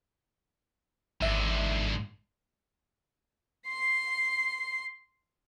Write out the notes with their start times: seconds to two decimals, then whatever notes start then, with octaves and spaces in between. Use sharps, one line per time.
1.21 G#1 G#2 D3 E5
3.68 C6 C7